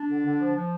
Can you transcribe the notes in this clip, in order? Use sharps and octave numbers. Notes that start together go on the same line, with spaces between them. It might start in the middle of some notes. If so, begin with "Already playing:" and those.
Already playing: D4
D3
D3
F3
F3